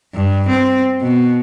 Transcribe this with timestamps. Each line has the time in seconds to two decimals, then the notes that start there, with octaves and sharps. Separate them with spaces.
0.14 G2
0.49 C4
1.01 B2